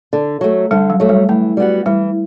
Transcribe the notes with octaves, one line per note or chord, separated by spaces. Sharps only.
D3
F#3 A3
D3 G3
F#3
F#3 A3
G3
E3 A3
G3 B3 F#4
E3 G3